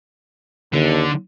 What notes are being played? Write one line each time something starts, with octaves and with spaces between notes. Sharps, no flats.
D#2 D3